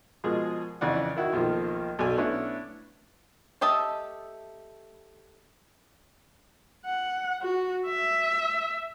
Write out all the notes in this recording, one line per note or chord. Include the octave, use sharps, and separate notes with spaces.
B2 F3 G#3 G#4 A#4
F2 C#3 E3 D5 D#5 F#5
D#3 E4 F#4
B1 D#3 F3 A#3
B1 F#3 A4 D5 G#5
A3 B3 C#4 D4 E4
A3 G4 D#5 E5 A5
F#5
F#4
E5